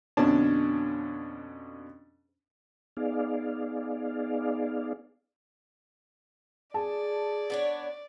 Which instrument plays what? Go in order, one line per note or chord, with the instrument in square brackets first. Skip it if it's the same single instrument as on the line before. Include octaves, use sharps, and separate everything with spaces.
[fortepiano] F2 B2 D3 C#4 D4 A5
[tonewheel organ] B3 D#4 G#4 D5 F5
[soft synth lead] G#4 [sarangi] D5 [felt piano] A5
[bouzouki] B3 D4 C#5